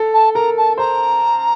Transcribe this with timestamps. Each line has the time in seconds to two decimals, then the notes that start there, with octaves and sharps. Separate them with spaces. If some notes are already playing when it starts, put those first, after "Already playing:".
Already playing: A4
0.13 A5
0.34 A#4 A#5
0.57 A5
0.78 C5 A#5